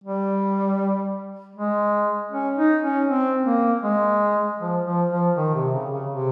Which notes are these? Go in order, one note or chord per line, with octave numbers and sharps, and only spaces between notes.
G3
G#3
C#4
D#4
C#4
C4
A#3
G#3
F3
F3
F3
D#3
C3
C#3
C#3
C3